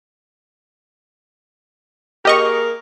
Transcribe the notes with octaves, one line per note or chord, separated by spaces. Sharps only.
A#3 G4 G#4 A#4 D#5 C#6